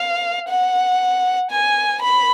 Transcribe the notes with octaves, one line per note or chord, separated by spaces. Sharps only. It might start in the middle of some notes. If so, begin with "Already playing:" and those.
Already playing: F5
F#5
G#5
B5